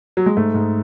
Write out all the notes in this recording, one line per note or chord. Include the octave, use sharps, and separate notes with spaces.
F#3
G#3
G#2 A3
G#2